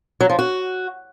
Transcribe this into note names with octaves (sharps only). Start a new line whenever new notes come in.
F#3
F3
F#4